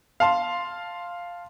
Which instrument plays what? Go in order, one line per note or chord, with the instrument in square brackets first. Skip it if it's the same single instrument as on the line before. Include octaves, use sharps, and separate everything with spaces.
[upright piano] F5 A5 C6